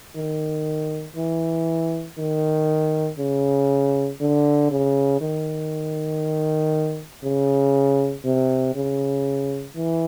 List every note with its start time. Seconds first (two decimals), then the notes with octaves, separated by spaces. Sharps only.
0.15 D#3
1.16 E3
2.18 D#3
3.18 C#3
4.21 D3
4.71 C#3
5.21 D#3
7.24 C#3
8.25 C3
8.75 C#3
9.76 E3